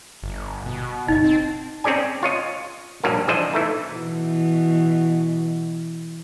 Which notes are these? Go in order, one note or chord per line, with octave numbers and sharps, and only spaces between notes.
G1
B2
F#1 D#4 D#5
C4
C4 C#4 G#4 D5 G#5
F4 C#5 D#5
A#1 G2 F#3 A#3
E3 F3 D4 G#4 C5 D#5
E3 A3 D#4
B2 E3